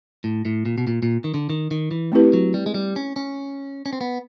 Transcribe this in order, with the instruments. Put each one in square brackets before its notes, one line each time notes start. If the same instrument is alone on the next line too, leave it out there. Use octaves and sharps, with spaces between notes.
[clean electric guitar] A2
A2
A#2
B2
A#2
A#2
D#3
D3
D#3
D#3
E3
[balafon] A3 C4 E4 G4 B4
[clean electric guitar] F#3
G3
G#3
G3
C#4
C#4
C#4
C4
B3